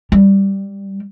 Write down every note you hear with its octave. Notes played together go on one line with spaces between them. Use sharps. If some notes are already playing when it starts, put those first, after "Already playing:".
G3